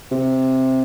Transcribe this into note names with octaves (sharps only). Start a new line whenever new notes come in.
C3